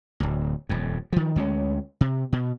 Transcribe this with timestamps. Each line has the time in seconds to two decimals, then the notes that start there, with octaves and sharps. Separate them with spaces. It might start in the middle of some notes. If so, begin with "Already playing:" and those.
0.20 D1 D2
0.69 D#1 F2
1.13 D#3 F3
1.36 D2 G#3 C4 C#4
2.01 C3
2.32 B2